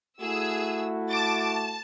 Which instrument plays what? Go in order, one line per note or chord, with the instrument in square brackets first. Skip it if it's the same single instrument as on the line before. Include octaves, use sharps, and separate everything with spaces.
[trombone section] A3 E4 F#4 [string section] G#4 E6
[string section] A5 D6 A6
A5